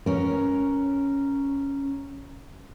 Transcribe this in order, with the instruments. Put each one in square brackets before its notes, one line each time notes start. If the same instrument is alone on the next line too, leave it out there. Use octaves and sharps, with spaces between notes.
[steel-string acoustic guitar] C#4 A#4